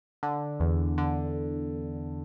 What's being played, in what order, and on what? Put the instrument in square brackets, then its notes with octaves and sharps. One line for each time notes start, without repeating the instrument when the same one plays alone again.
[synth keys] D3
E2
D3